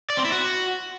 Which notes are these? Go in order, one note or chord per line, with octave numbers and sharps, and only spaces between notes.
D5
C4
E4
F#4